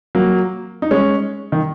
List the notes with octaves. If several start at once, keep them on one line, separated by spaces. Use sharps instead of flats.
F#3 A#3
D#4
G#3 C#4
D#3